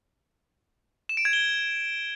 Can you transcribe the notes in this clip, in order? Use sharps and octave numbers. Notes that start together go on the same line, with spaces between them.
E7
D7
G#6
G7